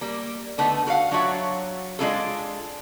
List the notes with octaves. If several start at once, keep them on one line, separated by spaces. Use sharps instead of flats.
G3 A#3
D3 A3 B3 D#4
F#4 A#4 B4 F5 F#5
F#3 D4 F4 F#4 C#5 E5
G#3 D4 E4 F4 G#4 A4